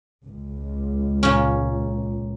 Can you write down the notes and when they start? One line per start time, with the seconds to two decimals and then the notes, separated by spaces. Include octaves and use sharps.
0.25 C#2
1.23 A#2 C#4